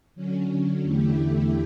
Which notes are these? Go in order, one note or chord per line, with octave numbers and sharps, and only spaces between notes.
D3 F#3 C#4
E2 D3 A3 E4 G4